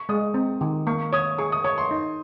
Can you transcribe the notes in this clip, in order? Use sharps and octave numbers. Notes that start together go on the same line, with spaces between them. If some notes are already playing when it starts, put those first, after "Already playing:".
Already playing: C#6
G#3 D#6
C4
D#3
A#3 C#6
C#5 D#6
G#4 C#6
D#6
C#5 C#6
C6
D#4